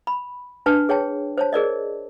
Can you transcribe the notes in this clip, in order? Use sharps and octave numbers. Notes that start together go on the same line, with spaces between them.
B5
D4 B4 A5
G#4 C#5 G5 A5
C5 C#5 A5
G#4 A#4 D5 D#5